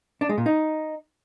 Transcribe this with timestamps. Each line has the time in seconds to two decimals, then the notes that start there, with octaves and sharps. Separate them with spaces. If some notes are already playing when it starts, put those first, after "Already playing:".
0.21 D4
0.29 G#3
0.38 A#2
0.46 D#4